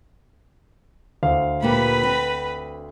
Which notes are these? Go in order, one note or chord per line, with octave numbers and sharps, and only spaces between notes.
D2 C5 F5
A#2 A#3 G4 B4 B5
C4